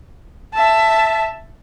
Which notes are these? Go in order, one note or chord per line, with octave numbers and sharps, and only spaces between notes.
E5 A5